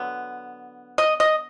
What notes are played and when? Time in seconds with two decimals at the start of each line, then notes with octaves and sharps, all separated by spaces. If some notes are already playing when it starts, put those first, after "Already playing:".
Already playing: D3 F#3 B3
0.98 D#5
1.20 D#5